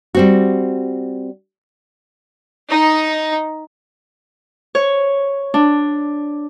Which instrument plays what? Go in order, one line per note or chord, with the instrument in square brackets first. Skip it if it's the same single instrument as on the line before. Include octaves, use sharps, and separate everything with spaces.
[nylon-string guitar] G3 C4 F#4
[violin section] D#4
[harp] C#5
D4